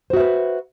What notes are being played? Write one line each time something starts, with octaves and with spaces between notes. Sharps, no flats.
F#4 B4 C5 E5